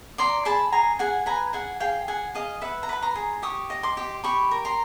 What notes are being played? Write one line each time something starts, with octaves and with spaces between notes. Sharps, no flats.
D5 A#5 C6
G#4 A5 B5
G#4 G#5 A#5
G#4 F#5 G#5
B4 G#5 A#5
G#4 F#5 G#5
G#4 F5 G5
G#4 F#5 G#5
G#4 D#5 F5
B4 E5 F#5
A#5
B4 B5
A#5 C6
G#4
G4 C#6 D#6
D#5
C6 D6
G4
G4 B5 C#6
A#4
A#5 C6